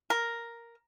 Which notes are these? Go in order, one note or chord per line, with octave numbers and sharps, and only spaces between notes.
A#4